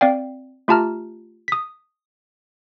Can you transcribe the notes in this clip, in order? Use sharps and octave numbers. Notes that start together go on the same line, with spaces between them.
C4 D5 F5 G5
A3 F4 G4 A5 A#5 F6
D#6 B6